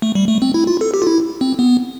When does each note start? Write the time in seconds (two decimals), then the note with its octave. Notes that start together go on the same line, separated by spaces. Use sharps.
0.02 A3
0.15 G3
0.28 A3
0.42 C4
0.54 E4
0.67 F4
0.81 A4
0.94 G4
1.02 F4
1.07 E4
1.41 C4
1.59 B3